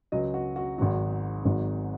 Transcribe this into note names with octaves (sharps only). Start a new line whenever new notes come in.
C#2 C#3 F#3 D#5
F#4
F#4
G#1 G#2 F#3 F#4
G#1 G#2 F#3